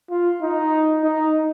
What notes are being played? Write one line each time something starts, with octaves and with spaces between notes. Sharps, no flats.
F4
D#4
D#4